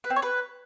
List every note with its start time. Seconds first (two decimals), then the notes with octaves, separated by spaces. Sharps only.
0.04 B4
0.10 C4
0.16 C#5
0.22 B4